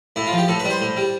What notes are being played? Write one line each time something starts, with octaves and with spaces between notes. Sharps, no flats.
A2 E4
F4
F3
G4
A2 A4
B4
G3
C5
A2
G3